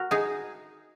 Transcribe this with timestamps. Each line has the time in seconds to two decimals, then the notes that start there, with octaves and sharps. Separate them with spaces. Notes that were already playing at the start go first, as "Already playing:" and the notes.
Already playing: F#4 A#4
0.11 D#4 G#4